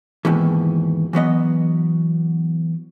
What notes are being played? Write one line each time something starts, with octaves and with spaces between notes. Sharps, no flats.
D#2 G#2 B2 E3
E3 F#3 B3 D#5